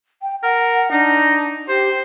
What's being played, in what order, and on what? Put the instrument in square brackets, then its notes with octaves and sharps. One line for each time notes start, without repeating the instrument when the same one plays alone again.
[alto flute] G5
[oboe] A#4 [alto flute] F#5
[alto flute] D4 [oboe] D#4
[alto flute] G4 [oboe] C5